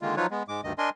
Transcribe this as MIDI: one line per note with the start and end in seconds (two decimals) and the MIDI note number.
0.02 0.16 50
0.02 0.16 51
0.02 0.16 56
0.02 0.16 58
0.02 0.16 65
0.17 0.27 53
0.17 0.27 54
0.17 0.27 63
0.17 0.27 65
0.17 0.27 71
0.17 0.27 73
0.31 0.43 56
0.31 0.43 59
0.48 0.61 44
0.48 0.61 56
0.48 0.61 86
0.64 0.73 38
0.64 0.73 43
0.64 0.73 51
0.64 0.73 75
0.78 0.90 62
0.78 0.90 70
0.78 0.90 75
0.78 0.90 80
0.78 0.90 84